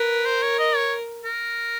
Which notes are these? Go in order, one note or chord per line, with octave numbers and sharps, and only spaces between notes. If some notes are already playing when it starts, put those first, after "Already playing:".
Already playing: A#4 B4
C5
C#5
D#5
C#5
A#4